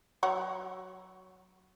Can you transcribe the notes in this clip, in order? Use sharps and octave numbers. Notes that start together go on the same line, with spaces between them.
F#3 C#5 F#5